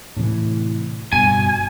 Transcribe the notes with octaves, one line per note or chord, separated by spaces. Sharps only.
A2 C3 E3
F#1 G2 B2 G#5